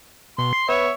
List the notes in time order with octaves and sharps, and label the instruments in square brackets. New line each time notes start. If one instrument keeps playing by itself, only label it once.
[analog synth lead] B2 [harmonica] C6
[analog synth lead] C7
[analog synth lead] B3 [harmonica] C#5 E5